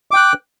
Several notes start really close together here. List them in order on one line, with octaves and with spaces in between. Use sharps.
D6 G5 F#6